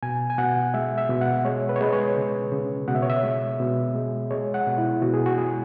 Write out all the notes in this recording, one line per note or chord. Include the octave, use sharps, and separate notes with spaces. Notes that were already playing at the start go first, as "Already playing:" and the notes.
B2 G#5
G#5
B2 F#5
G#3 E5
E5
B2
F#5
G#3 C#5
B4
C#5
G#3 B4
C#5
C#3
C#3
B2 F#5
E5
C#5
E5
G#3
B2
G#3
G#3 C#5
F#5
B2
E4
B2 F#4
G#4
F#4
G#3 G#4